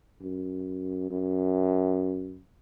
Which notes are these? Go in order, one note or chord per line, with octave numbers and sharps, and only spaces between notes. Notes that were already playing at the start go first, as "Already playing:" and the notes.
F#2
F#2